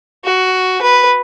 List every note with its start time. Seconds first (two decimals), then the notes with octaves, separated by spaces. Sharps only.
0.24 F#4
0.82 B4